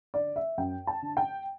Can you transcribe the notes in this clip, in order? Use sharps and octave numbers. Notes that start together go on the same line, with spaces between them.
D3 D5
E5
F#2 G5
A5
D3
G5